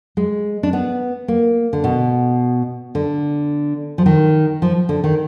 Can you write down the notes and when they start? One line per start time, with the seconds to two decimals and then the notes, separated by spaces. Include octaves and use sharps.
0.17 G#3
0.63 D4
0.73 B3
1.28 A#3
1.73 D3
1.84 B2
2.95 D3
3.98 F3
4.06 D#3
4.62 F3
4.89 D3
5.04 D#3